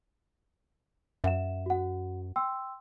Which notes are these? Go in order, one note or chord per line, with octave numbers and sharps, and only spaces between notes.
F#2 E5 F#5 E7
F#4 F#5
G5 C6 E6